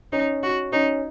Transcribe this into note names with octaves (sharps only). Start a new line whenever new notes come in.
C#4 D#4
F#4
C#4 D#4